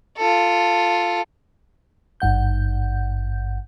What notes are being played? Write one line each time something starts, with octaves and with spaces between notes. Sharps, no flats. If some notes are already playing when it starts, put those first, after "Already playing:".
F4 A4
G#1 G2 F#5 G6